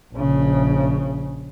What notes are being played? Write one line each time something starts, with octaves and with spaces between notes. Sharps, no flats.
A#1 C#3